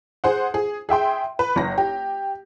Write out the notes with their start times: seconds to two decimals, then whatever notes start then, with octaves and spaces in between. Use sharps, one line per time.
0.24 G#4 C5 F#5
0.54 G#4
0.89 G#4 E5 G5 C6
1.39 B4
1.56 F#1 A#6
1.78 G4